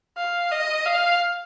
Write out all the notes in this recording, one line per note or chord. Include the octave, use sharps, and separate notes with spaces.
F5
D#5
F5